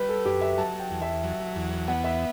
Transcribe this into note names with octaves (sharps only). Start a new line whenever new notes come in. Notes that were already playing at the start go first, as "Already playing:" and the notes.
Already playing: G3 B4
A4
F#2 G4
E5
F#3 A5
G5
E2
E5
F#3
E2
B3 F#5
E5